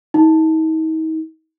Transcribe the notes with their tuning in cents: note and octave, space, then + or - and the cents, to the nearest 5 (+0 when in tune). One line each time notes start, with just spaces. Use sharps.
D#4 +40